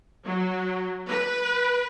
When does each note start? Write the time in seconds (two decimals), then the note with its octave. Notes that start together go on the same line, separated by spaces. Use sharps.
0.24 F#3
1.08 B4